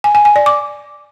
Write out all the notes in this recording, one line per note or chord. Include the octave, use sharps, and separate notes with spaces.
G#5
G#5
G#5
D5
D6